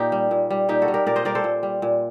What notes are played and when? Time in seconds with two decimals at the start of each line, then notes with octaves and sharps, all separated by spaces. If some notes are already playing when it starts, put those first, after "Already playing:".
Already playing: A#2 A#3 D#4 G4
0.12 G3
0.31 A#2
0.50 G3
0.69 A#2 D#4 G4
0.82 F#4 A4
0.88 G3
0.94 G4 A#4
1.06 A#2 A#4 D5
1.16 C5 D#5
1.25 G3 A#4 D5
1.35 A4 C5
1.44 A#2
1.63 G3
1.82 A#2